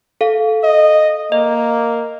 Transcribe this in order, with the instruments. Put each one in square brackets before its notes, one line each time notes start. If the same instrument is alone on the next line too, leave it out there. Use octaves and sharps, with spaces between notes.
[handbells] A4 F5
[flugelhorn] D#5
[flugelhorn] A#3 [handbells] D#5